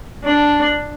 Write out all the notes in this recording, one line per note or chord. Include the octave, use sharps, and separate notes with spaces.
D4